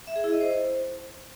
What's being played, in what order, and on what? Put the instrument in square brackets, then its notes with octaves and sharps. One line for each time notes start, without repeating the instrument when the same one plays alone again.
[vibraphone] E5
G#4
E4
D#5
C5